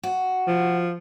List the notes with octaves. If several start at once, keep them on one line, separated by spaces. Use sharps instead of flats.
F#4
F3